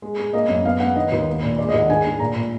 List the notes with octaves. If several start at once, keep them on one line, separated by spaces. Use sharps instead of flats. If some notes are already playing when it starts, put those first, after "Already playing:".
G#3
G#3
A#3 D#5
F#2
B3 F5
B3 F#5
D#3 D#5
D#2
A#3
A#2
G#3 D5
D#5
D#2
F#5
G#2 G#5
G#2
A#2 A#5
A#2